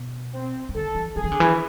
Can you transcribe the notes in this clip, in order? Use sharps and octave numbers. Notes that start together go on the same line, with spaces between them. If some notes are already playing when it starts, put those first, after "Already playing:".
Already playing: B2
C4
E3
D3 A4
E3
F3 G#4
E3
D3
E3